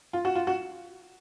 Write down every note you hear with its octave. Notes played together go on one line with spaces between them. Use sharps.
F4
F#4
F4
F#4